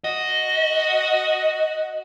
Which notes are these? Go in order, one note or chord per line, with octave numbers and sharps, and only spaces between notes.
F#4 D#5